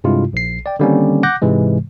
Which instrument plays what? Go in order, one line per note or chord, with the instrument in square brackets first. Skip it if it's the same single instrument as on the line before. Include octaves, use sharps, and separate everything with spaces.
[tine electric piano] G2 C3 G#3 E4 F4
A#1 C7
D5 G5
D3 D#3 G3 A#3 C4 C#4
F#5 D6 F#6 G6 A#6
G#2 C3 E3 G#3